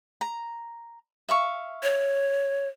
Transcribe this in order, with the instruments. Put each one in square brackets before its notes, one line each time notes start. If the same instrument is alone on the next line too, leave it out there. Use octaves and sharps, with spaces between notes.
[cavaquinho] A#5
E5 F5 C#6
[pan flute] C#5